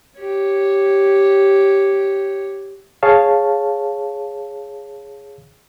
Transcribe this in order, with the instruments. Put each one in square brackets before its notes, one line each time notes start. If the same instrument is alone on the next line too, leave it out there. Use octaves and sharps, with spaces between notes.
[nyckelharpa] G4 C#5
[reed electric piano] G#4 C#5 F5 A5